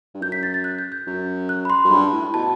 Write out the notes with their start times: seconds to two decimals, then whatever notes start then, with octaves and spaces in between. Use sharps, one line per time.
0.14 G2
0.22 F#2 G6
0.32 B6
0.43 A6
0.54 A6
0.64 F#6
0.79 G6
0.92 G6
1.07 F#2
1.49 F#6
1.65 B5
1.70 C6
1.84 F#2
1.91 G2 B5
2.13 A2
2.34 B2 A5